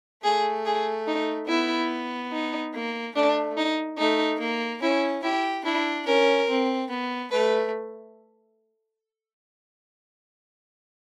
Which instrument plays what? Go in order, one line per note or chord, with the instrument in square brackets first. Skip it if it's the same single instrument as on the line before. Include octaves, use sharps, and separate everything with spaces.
[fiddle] A3 [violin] G#4
[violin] G#4
D#4
[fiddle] B3 [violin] E4
[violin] D#4
[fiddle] A#3
[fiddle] A3 [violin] D4
[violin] D#4
[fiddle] A3 [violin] D#4
[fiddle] A#3
[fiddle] C#4 [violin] E4
[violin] E4 [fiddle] G4
[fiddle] D4 [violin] E4
[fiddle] C#4 [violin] A#4
[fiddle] C4
B3
[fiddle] A3 [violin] B4